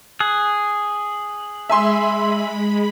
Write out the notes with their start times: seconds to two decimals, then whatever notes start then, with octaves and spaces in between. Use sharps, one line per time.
0.20 G#4 F#6
1.70 G#3 E5 G#5 B5 C6